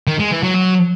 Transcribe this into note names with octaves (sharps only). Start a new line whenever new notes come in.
D#3
G#3
E3
F#3
F#3